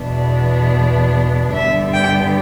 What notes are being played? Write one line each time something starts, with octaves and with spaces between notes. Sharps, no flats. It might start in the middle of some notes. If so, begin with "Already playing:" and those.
Already playing: E2 B2 B3 D4
G2 D3 G3 B3 E5
G5